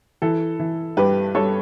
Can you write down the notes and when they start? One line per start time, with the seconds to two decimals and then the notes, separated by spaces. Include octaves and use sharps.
0.22 E3 A4
0.60 E3
0.97 G2 G4 B4
1.35 G2 A4 C#5